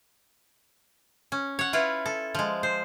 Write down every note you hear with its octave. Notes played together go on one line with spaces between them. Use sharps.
C#4
C#5 F#5
E4 F4 B4
A4
F3 G#3
C5